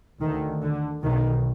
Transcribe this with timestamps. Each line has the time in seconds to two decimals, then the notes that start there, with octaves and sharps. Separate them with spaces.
0.20 D2 D#3
0.62 D3
1.03 B1 B2 D#3